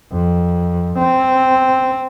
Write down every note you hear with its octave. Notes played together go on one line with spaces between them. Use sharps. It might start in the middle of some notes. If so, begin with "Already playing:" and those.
F2
C4